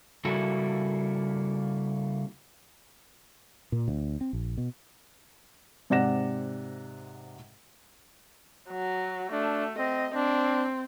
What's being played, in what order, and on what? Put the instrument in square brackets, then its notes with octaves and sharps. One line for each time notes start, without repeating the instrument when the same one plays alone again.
[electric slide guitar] C#3 G3 A#3 E4 F#4 A4
[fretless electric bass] A#2
D2
C4
A#1
B2
[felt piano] G#2 C3 D5 F#5 A#6 E7
[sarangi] F#3
[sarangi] A3 [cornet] D4
[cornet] C4 [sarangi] D#5
[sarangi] C4 [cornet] D4